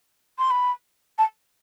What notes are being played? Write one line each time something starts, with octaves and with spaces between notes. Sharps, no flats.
C6
B5
A5